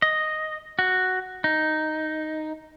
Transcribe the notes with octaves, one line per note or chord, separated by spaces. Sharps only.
D#5
F#4
D#4